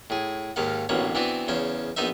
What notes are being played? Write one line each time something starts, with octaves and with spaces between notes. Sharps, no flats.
A2 G#4
D#2 G#2 D#3 F5 F#5
A1 D2 B2 A#3 C#5
E3 B3 C4 D4 F#4
E2 C#3 C5 C#5
A#1 B3 D#4 C5 E5